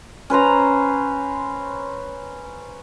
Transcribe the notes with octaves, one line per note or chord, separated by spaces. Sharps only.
C#4 B4 C5 A#5